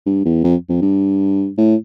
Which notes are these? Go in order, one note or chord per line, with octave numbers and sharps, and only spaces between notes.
G2
E2
F2
F2
G2
A2